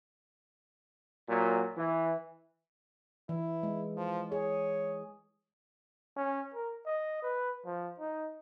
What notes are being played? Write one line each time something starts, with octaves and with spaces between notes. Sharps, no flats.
A#2 F#3
E3
E3 E4
G#3
F3
G#4 C#5
C#4
A#4
D#5
B4
F3
D#4